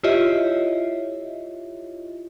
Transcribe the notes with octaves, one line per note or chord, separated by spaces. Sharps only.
E4 F4 G4 C#5 D#5 E5